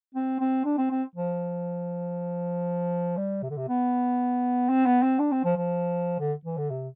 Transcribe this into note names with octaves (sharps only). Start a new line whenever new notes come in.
C4
C4
D4
C4
C4
F3
G3
C3
D3
C3
B3
C4
B3
C4
D4
C4
F3
F3
D3
E3
D3
C3